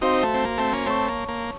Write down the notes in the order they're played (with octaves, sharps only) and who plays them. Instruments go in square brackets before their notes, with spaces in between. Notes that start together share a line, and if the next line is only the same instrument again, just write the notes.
[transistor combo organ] C4 D#4 [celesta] F#4 C5 F5 C6
[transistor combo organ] A3
C4
A#3
A3 C4
A#3 C#4
[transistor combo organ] A3 C4 [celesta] C#5 A5 C#6
[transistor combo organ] A#3
A#3